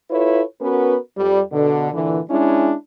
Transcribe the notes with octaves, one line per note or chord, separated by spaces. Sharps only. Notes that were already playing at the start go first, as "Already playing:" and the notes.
E4 F4 A4 B4 C#5
B3 C#4 F#4 A#4 B4
F2 G3
B2 D3
A#2 D3 E3
G#3 C#4 D4 E4